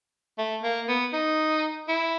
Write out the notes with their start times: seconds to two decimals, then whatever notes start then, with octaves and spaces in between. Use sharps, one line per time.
0.38 A3
0.63 A#3
0.88 B3
1.13 D#4
1.89 E4